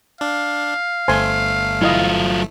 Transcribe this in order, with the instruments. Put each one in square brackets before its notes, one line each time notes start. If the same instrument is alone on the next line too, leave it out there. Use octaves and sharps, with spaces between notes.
[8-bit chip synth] D4 [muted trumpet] F5
[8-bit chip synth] G1 A3 [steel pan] C5 G#5 C6
[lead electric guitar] F#3 F4 [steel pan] E4 D#5